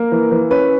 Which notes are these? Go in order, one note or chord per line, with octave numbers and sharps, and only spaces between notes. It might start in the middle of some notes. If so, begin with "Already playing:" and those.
Already playing: A#3 A#4
E3
E3
C#4 B4